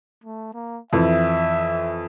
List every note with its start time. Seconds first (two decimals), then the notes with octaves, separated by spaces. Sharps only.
0.24 A3
0.54 A#3
0.93 F2 E3 E5